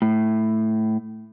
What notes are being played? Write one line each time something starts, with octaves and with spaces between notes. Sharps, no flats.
A2